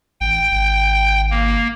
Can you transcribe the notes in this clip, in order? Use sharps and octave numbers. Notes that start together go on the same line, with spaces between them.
A1 G5
G#1
A#3